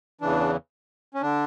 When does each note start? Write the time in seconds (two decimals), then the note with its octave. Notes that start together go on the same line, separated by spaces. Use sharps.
0.21 E2 C#3 E3 D4
1.14 C#4
1.22 D3 D4